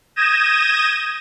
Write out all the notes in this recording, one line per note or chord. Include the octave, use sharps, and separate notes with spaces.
D#6 G6 G#6 A#6 D#7 E7